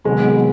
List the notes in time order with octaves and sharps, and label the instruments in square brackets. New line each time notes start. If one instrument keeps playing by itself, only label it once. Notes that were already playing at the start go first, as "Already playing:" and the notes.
[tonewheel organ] C3 D#3 F#3 B3 [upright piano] G#3